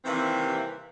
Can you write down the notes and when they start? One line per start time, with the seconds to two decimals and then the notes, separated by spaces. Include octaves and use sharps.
0.05 C3 D#3 E3 G3 A#3 C4